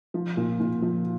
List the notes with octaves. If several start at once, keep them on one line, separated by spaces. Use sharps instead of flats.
F3
A#2
A#2
F3